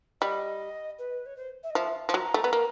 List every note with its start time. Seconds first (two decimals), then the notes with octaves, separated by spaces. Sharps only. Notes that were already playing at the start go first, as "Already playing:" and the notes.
0.21 G3 D#5
0.99 B4
1.26 C#5
1.37 C5
1.63 E5
1.70 D#5
1.75 F3 E5
2.09 F3
2.14 F#3 A#5
2.34 A3
2.44 B3
2.53 A#3